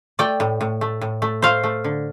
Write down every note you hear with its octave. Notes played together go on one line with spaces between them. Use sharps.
A3 D5 G5
A2
A2
A3
A2
A3
A3 C5 F5
A3
D3